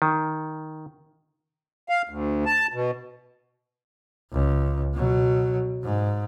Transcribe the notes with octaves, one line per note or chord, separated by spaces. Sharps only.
D#3
F5
D2
A5
B2
C#2
B2 F#3
G#2